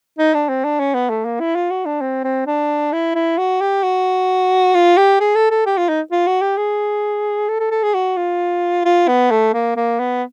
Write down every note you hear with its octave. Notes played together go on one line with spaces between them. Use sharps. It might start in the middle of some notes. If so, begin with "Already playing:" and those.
D#4
D4
C4
D4
C#4
B3
A3
A#3
E4
F4
F#4
D4
C4
C4
D4
E4
E4
F#4
G4
F#4
F4
G4
G#4
A4
A4
G4
F4
D#4
F4
F#4
G4
G#4
A4
A4
A4
G#4
F#4
F4
F4
B3
A3
A#3
A#3
B3